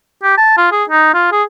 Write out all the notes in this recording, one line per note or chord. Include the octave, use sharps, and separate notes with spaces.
G4
A5
F4
G#4
D#4
F4
G#4